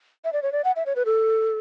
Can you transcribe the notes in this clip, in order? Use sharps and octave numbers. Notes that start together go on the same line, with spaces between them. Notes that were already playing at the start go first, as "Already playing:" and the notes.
E5
D5
C#5
D5
F#5
E5
C#5
B4
A4